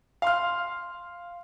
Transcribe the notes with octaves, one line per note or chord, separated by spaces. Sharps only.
F5 C6 F6